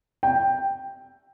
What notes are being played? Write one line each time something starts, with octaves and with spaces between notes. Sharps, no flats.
G5